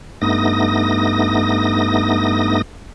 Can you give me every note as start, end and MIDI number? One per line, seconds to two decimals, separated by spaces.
0.22 2.62 43
0.22 2.62 57
0.22 2.62 59
0.22 2.62 63
0.22 2.62 87
0.22 2.62 94